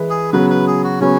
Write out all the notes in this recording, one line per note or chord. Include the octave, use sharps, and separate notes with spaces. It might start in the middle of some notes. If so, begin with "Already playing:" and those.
Already playing: E3 G#3 E4 B4
G#4
C#3 F#3 B3 B4
B4
G#4
F#4
C#3 F#3 B3 C#4